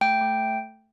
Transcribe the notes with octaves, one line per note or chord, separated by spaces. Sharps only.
A3 G5
A3